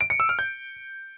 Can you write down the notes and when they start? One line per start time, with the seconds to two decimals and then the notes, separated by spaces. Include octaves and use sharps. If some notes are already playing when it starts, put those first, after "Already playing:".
0.01 D7
0.10 C#7
0.20 E6
0.29 F6
0.39 G6